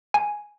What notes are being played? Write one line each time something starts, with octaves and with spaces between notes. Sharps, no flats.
G#5